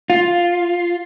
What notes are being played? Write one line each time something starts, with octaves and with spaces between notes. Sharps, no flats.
F4